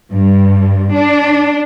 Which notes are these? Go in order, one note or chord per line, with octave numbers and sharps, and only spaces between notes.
G2
D4